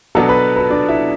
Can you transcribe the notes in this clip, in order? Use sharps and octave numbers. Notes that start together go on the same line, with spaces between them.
B2 F#3 B3 D4 A4 A5
B4 B5
B4 B5
D4 D5
E4 E5